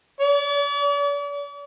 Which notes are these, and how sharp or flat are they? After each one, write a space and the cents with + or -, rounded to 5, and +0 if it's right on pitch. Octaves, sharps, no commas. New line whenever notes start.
D5 -45